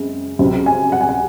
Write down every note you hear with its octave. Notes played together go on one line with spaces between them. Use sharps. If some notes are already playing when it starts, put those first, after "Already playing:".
Already playing: F#2 C#3 G#3 C4
C#2 C3 F#3 C4
G#5
F#5
G#5
F#5